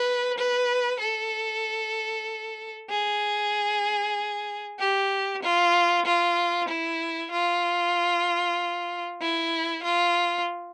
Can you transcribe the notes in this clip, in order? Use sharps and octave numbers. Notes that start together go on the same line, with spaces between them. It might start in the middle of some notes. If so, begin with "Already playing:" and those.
Already playing: B4
B4
A4
G#4
G4
F4
F4
E4
F4
E4
F4